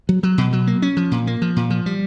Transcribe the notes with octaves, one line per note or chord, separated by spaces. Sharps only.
F#3
F#3
B2
F#3
A#3
C#4
F3
A#2
A#3
F3
A#2
F3
G3